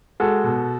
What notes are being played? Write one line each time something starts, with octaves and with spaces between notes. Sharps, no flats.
G#3 F#4 A4
B2